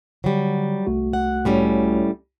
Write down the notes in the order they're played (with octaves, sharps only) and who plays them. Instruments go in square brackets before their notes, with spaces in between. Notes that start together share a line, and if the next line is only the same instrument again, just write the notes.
[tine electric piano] D3 [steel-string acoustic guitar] F#3 G3
[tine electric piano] C2 A3 F#4
[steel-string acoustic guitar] F#5
A2 G3 C#4